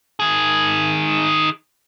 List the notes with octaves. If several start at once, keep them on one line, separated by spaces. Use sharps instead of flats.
D#3 G#4